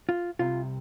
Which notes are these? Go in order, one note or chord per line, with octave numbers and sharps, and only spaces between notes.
F4
C2 C3 F4